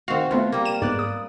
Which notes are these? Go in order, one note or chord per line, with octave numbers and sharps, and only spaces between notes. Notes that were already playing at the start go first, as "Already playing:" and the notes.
D#3 C4 F#4 F5
A3 B3 C4 F4
G3 A#3
D#7 E7
G#2 B3 D5 F#6
D#6